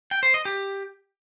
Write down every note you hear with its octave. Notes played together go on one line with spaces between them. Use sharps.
G5
C5
D#5
G4